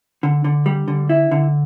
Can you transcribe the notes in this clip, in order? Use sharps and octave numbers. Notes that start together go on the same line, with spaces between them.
D3
D3
G3
D3
E4
D3